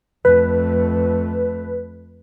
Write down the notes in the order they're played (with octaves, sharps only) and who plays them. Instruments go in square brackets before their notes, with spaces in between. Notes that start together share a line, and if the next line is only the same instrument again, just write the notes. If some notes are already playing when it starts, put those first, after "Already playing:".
[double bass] F2 A3 [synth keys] B4